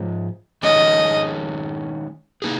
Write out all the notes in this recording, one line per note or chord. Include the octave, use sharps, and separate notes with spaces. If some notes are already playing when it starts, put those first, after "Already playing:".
Already playing: G#2 F3 G#3 C#4
D#3 G#3 C#4 G#4 D#5
A#3 D#4 G#4